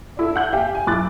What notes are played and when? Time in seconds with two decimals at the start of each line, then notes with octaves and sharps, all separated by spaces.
0.17 D4 E4 A4
0.36 F#5 G6 F#7
0.53 G4 E5 F5 G5 G#5
0.75 G#5
0.87 B1 E4 D6 F#6 A6